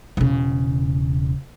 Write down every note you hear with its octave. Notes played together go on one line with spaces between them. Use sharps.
E1 C#3